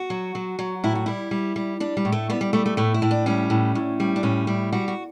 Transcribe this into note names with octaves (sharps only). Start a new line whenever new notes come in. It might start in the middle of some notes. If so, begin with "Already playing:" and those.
Already playing: F#4
F#3
F#3
F#3
A2 E4
F#4
G3 E4
G3
G3
G3 D4
G3
A2
A3
G3 B3
G3
G3 A3
A3
A2 A3
E4
A2
D4
G3 C#4
A2
A2
G3
D4
A2 C#4
G3 E4
G3 F#4
F#4